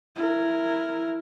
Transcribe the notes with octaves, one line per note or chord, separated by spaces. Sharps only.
E4 A#4